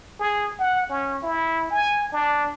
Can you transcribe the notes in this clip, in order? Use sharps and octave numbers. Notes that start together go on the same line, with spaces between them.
G#4
F#5
C#4
E4
G#5
D4